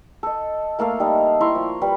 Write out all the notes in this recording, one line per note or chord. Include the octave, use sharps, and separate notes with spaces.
A4 D#5
A3 A#3 A4 F5
G3 D#4
E4 A#5 C6 C#6
F3
G3 B4